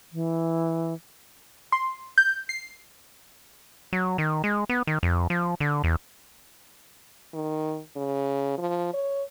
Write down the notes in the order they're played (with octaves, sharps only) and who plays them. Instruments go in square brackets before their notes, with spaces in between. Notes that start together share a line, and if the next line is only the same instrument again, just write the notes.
[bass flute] E3
[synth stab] C6
G6
C7
[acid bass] F#3
D#3
G#3
B3
D#3
F2
F3
D3
E2
[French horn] D#3
C#3
F3
C#5